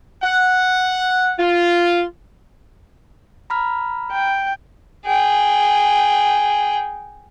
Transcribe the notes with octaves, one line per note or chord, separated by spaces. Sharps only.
F#5
F4
A#5 B5 F6
G5
G#4 G5